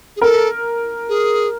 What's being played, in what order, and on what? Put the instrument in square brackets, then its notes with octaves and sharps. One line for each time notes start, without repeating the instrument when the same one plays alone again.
[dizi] G#4
[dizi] A4 [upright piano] A#4
[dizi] G#4